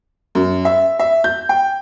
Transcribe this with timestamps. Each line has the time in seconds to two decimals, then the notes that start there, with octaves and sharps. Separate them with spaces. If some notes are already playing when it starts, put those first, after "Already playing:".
0.35 F#2
0.65 E5
0.99 E5
1.24 G6
1.49 G5